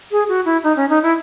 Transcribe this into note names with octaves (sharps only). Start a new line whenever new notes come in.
G#4
F#4
E4
D#4
C#4
D#4
E4